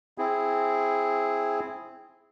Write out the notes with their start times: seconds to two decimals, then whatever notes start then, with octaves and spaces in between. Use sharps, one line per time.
0.18 C4 E4 G#4